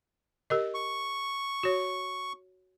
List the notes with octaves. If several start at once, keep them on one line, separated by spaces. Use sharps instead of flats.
G4 A#4 D#5
C#6
F#4 C#5